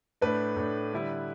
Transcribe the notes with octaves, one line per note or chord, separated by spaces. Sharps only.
A2 A3 D4 B4
A2 A3 D4
D3 G3 E4